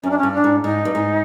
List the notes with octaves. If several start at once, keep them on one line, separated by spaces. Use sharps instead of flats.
F#2 C#4
D4
C#4
G2
D4
G#2
G#2 D#4
G2
G#2